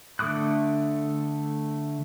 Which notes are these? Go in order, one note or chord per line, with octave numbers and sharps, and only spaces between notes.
D3 A3 D6 D#6 F#6